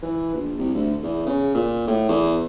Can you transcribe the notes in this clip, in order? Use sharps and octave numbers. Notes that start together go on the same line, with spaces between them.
E3
A#1
C2
D2
E2
C#3
A#2
A2
E2